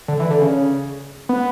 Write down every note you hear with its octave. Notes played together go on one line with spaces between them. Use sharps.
D3
E3
D3
C#3
B3